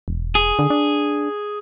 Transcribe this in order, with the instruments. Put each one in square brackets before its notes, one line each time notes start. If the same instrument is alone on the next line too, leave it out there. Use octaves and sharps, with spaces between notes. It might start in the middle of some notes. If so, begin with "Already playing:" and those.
[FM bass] E1
[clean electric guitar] G#4
[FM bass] D3
D4